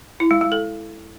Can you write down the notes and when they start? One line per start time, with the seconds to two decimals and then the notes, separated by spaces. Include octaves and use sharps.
0.20 E4
0.31 G#3
0.41 G#3
0.52 A4